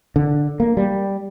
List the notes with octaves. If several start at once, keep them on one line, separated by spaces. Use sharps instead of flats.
D3
A#3
G3